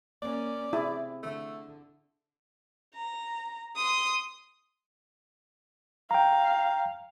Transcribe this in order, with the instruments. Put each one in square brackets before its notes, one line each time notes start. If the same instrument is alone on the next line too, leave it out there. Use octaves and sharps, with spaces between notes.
[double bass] A#3 C#4 [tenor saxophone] D5
[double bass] C3 [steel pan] E4 G#4
[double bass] D3 [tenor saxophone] A3
[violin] A#5
C6 D#6
[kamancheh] F5 [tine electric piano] G5 A#5